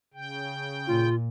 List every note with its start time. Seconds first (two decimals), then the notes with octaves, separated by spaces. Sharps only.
0.14 C#3 G5
0.87 A#2 F4